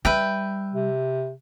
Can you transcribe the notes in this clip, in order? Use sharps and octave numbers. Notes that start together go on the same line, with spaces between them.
G3 B4 E5 G5
C3